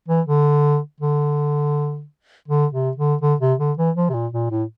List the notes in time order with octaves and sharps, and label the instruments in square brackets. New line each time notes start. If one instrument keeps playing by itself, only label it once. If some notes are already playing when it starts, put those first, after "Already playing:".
[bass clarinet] E3
D3
D3
D3
C3
D3
D3
C3
D3
E3
F3
C3
A#2
A#2
A2